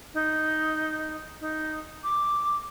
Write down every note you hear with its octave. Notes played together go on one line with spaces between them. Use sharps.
D#4
D#4
D6